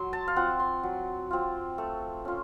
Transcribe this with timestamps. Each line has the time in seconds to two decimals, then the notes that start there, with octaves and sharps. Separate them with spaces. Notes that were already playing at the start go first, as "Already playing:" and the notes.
Already playing: F#3 C6
0.13 A5
0.28 F5
0.36 C4 F4 F#5
0.59 C6
0.83 F#3
1.31 C4 F4
1.78 A3
2.25 C#4 F4